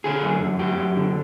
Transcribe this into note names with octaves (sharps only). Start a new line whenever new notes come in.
D3 G#4
F#2
F#2
F#2 G4
F#2
D3